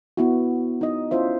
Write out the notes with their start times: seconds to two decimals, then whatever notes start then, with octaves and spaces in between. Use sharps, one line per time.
0.17 B3 E4 F#4
0.81 D#4 D#5
1.11 C#4 E4 F4 C5 E5